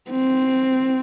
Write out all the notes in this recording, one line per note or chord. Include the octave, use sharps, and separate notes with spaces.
C4